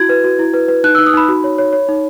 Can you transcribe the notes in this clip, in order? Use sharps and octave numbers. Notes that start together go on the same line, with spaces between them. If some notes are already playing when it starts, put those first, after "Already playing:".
Already playing: E4 F#4 G#6
B4
F#4
E4
B4
B4
D#4 F#6
E6
D#4
D#6
D#4 B5
F#4
C#5
C#5
C#5
D#4